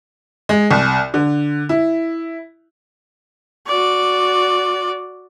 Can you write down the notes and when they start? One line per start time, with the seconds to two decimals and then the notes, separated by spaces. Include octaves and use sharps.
0.49 G#3
0.71 C2
1.14 D3
1.69 E4
3.67 F#4 D5